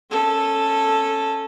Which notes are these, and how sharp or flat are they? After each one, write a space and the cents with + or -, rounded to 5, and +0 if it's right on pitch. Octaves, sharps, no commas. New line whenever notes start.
C#4 -15 A4 +0